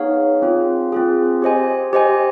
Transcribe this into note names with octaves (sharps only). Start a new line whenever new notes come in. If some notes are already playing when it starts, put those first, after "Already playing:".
Already playing: B3 D#4 G#4 C#5 F5
C4 F4 G#4
C4 F4 G#4
G4 C5 D#5 G#5
G4 C5 D#5 G#5